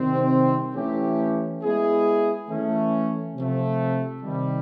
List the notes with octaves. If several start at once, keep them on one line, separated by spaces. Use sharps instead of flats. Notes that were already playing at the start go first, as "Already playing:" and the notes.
Already playing: C3 D#3 G3 C4
E3 A3 C#4 E4 G4
G#3 B3 E4 G#4
E3 A3 C#4
C3 F3 A3
C3 D#3 G3